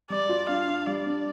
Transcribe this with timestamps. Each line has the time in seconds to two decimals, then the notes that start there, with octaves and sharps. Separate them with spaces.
0.10 G3 D5
0.29 F4
0.49 D4 F5
0.68 D4
0.87 G3 D5
1.06 D4